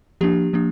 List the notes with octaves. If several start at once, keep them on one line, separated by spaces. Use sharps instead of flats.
F3 A#3 D4 G4
F3 A#3 D4